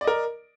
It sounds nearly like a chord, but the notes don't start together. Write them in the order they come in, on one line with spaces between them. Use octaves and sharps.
D5 D#5 A#4